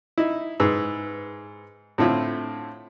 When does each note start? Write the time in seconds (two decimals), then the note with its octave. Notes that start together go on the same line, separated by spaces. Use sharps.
0.18 D#4 E4
0.60 G#2 G#4 B4 E6
1.98 A2 D3 C4 E4 F4